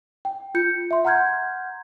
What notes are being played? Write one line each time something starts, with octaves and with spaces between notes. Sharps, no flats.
G5
F4 G6 C#7
E5 C6
F#5 A#5 C6 F6 G6 G#6